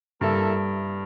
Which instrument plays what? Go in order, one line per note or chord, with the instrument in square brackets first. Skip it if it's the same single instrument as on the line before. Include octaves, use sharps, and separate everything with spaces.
[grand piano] G2 [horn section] A#3 E4 A4 E5